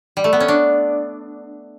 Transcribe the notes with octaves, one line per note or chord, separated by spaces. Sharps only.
G3
A3
B3
C#4
D4